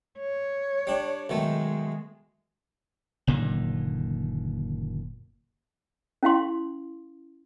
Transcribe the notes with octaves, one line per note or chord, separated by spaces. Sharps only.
C#5
G3 D4
B1 D#3 G#3 A3
F#1 A#2 D3 D#3
C#4 E4 F5 C6